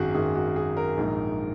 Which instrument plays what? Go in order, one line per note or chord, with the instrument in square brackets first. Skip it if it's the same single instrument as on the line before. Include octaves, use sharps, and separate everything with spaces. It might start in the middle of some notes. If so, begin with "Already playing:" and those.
Already playing: [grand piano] G#1 F#2 D#3 F#4 G#4
G#1 F#2 D#3 G#4
F#4
G#4
A#4
A#1 G#2 D#3